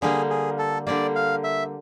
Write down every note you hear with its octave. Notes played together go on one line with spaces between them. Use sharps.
D3 G3 A#3 G#4
G#4
A4
D3 G3 A#3 D5
F5
E5